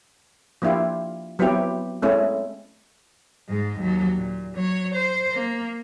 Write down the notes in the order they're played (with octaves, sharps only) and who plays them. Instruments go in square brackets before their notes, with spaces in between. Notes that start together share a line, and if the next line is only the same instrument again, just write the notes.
[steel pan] F3 A#3 D4 E4 F4 G4
F#3 B3 C4 E4 F#4 G4
G#3 A3 C4 C#4 E4 G#4
[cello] G#2 G#3
D#2 F#3
A#2
F#3 C#5
C5
A#3